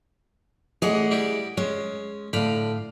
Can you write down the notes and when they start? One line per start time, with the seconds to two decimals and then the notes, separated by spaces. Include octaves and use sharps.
0.82 A1 E3 G#4 D#5 F#5
1.11 G3 E4 G4
1.57 G#3 C#4
2.33 A2 D3 F5 B5